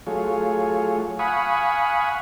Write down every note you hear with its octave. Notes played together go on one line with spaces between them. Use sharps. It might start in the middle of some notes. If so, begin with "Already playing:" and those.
F#3 A3 F4 G#4 C#5
F5 F#5 G#5 B5 C#6 D#6